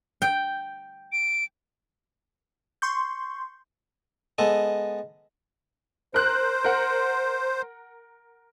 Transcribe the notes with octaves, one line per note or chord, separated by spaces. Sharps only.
G5
D7
C6 C#6 G6
G#3 B3 A4 D#5
A#4 C5 F#6
A#4 F#5